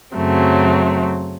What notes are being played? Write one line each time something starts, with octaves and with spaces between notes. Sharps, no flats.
F#2 C#3 F#3 A3 C4